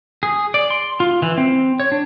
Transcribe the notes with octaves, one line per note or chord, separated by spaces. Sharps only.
G#4
D5
C6
F4
E3
C4
C#5
D4